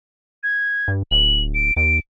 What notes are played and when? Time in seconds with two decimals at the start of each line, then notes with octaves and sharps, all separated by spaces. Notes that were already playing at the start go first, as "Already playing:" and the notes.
0.43 G#6
0.88 G2
1.11 D1 F#7
1.54 D7
1.77 D#2 D7